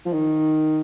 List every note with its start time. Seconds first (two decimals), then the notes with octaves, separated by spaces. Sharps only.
0.06 F3
0.13 D#3